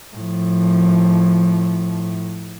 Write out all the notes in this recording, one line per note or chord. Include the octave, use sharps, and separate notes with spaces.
A2 F3